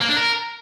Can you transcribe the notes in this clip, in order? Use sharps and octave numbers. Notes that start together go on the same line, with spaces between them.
A#3
D4
A#4